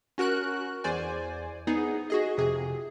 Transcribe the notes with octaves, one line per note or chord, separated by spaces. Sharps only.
C#4 F#4 A#4 F#6
E2 C5 D5 G#5
B3 D#4 G#4
F#4 G#4 D#5
F2 C3 G#4